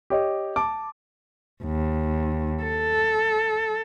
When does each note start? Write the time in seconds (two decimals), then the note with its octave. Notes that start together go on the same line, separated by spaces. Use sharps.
0.10 G4 C#5 D#5
0.56 A5 D6
1.63 D#2
2.63 A4